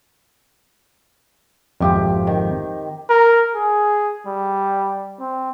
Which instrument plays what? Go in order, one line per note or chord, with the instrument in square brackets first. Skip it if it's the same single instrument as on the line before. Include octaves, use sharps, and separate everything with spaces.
[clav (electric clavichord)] G#1 F2 [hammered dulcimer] C4 G4 E5
[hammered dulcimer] D#3
[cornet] A#4
G#4
G3
C4